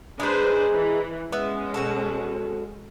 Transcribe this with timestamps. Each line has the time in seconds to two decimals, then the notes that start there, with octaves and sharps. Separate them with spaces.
0.20 G#3 D4 D#4 G#4 B4 C5
0.73 E3
1.32 G#3 B3 C#4 E5
1.74 B2 F#4 A4